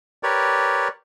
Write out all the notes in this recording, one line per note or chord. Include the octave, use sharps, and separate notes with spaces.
G4 A#4 B4 C#5 D5